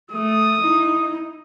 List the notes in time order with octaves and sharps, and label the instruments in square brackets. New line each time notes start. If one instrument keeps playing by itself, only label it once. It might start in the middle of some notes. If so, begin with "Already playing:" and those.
[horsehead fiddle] A3 [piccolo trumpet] D#6
[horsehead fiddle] D#4 E4